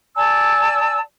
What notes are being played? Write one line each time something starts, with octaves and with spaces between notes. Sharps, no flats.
D5 G#5 A5 E6